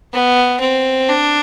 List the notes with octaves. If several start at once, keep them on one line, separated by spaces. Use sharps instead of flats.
B3
C4
D4